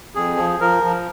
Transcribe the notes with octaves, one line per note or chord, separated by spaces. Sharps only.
F2 G#4
F3
F3 A#4
F3